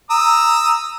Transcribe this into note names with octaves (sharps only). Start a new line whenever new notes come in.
A#5 D#6 E6